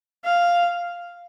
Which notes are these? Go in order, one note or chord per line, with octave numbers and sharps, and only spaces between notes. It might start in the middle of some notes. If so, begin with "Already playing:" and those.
F5